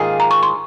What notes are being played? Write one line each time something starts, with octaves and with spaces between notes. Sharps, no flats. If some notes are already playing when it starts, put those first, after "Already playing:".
Already playing: G#2 D#3 A#3 F4 G#4
A#5
C#6
C6